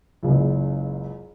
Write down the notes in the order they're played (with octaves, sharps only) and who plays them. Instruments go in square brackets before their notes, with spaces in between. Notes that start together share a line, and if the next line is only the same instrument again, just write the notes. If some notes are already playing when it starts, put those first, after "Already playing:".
[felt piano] F#1 C#2